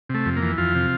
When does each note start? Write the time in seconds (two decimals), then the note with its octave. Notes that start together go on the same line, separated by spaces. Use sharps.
0.09 C3
0.15 A3
0.26 F2
0.37 A#3
0.42 E3
0.58 F2 F4
0.75 C3